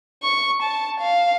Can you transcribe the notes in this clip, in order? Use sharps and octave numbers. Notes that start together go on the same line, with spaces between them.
C#6
A5
F5